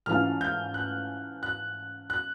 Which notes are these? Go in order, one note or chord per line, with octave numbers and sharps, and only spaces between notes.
G#2 E3 A3 C#4 F4 F6
G6
F#6
F#6
F#6